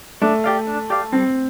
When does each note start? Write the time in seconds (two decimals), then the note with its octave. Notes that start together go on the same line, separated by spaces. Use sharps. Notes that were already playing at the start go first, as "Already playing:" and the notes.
0.21 A3 D4
0.44 G4 D5 F5
0.67 D4
0.90 G4 D5 F5
1.12 G3 C4